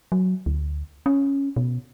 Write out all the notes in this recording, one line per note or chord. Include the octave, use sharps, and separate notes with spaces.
F#3
D2
C#4
B2